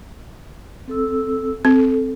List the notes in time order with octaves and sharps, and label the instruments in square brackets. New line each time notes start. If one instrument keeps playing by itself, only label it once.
[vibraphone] C4 A4 E6
[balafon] C4 [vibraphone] A4